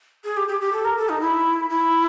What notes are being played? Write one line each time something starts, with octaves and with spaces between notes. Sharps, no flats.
G#4
G4
G4
G4
A4
A#4
A4
D#4
E4
E4